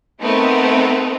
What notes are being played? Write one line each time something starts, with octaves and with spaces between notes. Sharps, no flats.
A3 B3 C4 D#4 A#4 B4